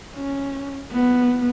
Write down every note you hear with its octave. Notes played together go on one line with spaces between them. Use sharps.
C#4
B3